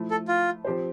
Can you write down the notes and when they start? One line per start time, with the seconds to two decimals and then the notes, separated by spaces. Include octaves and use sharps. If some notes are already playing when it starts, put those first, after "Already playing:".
Already playing: F3 A3 E4
0.11 A4
0.28 F4
0.65 F3 C4 G4 C5